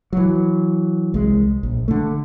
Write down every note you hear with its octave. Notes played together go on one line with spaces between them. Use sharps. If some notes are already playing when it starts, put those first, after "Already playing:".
E3 F#3
C2 G#3
A#1
D3 A3